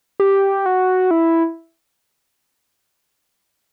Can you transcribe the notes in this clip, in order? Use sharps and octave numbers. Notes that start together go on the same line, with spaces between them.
G4
F#4
E4